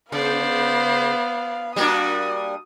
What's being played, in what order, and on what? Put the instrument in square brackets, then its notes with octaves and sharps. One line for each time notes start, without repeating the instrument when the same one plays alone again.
[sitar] C#3 [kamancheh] B3 F5 [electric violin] C5 D5
[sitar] G3 A#3 D4 [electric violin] F#4 [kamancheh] D#6